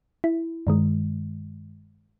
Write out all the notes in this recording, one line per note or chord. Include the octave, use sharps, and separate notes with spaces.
E4
G2 D#3 G#3